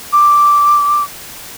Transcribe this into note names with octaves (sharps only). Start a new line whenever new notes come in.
D6